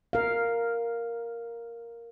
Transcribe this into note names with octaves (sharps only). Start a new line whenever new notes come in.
A#4 F5